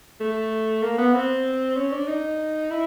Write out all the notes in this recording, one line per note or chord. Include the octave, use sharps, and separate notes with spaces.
A3
A#3
B3
C4
C#4
D4
D#4
E4